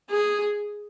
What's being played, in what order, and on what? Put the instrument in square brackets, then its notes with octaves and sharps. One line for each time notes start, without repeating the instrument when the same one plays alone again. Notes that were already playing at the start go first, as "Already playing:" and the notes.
[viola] G#4